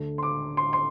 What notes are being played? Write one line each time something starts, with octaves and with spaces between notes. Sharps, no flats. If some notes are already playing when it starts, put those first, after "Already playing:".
Already playing: D2 D3 A3
C6
D6
C6
C6